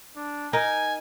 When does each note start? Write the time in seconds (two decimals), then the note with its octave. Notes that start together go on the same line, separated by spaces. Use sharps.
0.16 D4
0.53 D#4 A#4 G#5